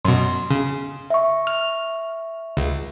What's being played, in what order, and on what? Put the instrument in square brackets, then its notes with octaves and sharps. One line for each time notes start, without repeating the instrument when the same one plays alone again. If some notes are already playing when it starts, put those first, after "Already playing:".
[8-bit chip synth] F#2 B2 [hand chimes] C6
[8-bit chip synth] C#3
[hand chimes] E5 C#6
[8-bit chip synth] F6
C#2